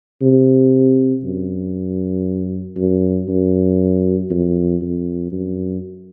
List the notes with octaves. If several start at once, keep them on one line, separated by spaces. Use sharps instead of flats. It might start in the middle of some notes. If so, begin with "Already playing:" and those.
C3
F#2
F#2
F#2
F2
F2
F#2